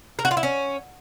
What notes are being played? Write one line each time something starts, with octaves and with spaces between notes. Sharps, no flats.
A#4
F#4
F4
E4
C#4